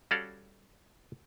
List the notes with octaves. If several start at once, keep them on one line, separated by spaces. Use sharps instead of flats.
G3 C#4 F#4 A4 D5 F5